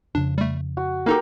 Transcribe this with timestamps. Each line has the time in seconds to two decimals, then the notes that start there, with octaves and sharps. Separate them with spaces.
0.15 F2 C#3 D4
0.38 G3 A3
0.77 F#4
1.06 A#3 D#4 G4 A4 A#4